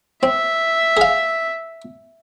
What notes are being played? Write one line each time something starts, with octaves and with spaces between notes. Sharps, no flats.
C4 E5
G#4 F5